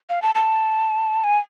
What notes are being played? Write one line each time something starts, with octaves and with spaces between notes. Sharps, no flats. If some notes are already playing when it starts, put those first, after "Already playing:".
F5
A5
A5
G#5